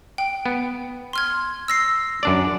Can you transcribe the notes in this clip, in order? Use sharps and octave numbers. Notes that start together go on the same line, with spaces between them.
G5
B3
C6 F6 G#6
E6 A#6 C7
F#2 D4 D5